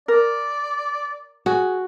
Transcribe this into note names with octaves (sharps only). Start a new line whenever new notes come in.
A#4 D5
F#4 G#4